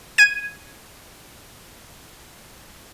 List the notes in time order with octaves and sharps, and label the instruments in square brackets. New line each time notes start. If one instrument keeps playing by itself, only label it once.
[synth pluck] G#6 D#7